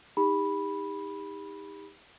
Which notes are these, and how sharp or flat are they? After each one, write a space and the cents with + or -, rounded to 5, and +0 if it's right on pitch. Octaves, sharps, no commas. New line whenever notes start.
D#4 +25 G4 +35 B5 -5